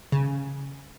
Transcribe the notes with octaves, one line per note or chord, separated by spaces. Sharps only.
C#3